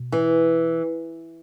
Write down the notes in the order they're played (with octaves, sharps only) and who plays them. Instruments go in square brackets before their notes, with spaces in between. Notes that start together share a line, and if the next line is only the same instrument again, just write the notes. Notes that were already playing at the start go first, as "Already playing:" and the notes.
Already playing: [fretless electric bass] B2
[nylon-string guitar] E3